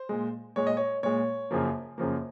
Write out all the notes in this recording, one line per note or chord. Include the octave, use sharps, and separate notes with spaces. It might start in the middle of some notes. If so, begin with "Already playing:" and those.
Already playing: C5
A#2 G#3
A#2 G#3 C#5
D#5
C#5
A#2 G#3 C#5
F#2 C#3 F3 A#3
F#2 C#3 F3 A#3